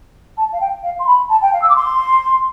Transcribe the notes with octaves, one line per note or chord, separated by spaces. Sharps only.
A5
F5
G5
F5
C6
B5
A5
G5
F5
E6
D6
C6